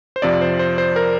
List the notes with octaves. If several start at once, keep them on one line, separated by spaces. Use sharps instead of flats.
C5
F2 C3 F3 D5
C5
C5
C5
A#4